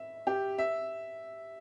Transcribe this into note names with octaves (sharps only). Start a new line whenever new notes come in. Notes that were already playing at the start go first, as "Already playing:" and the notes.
Already playing: E5
G4
E5